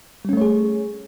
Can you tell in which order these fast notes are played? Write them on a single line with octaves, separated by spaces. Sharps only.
G3 C#4 A3 C#5 G#4